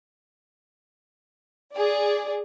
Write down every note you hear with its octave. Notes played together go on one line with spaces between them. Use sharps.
G#4 D5